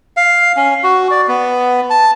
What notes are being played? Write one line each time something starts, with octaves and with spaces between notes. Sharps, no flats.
F5
C#4
F#4
D5
B3
A5